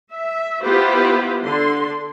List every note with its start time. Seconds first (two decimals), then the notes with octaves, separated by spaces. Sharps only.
0.11 E5
0.63 B3 E4 F4 G4 B4 C5
1.43 D3 C6